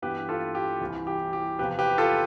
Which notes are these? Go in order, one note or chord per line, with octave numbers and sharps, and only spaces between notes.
G2 E3 B3 G4 B4
F4 A4
G4
C2 C3 E3
G4
G4
E2 C3 F3 G4 B4
G4 B4
F4 A4